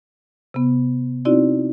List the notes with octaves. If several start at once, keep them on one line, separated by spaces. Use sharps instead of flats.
C3 B3
C4 D#4 E4 F#4 D5